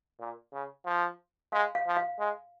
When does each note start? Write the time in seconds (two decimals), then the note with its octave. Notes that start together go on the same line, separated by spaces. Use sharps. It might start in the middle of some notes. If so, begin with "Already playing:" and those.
0.20 A#2
0.53 C#3
0.86 F3
1.53 G#3 F5
1.75 F5
1.87 F3
1.97 F5
2.19 G#3